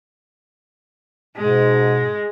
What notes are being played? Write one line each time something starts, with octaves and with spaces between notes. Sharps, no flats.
G#2 B2 G#3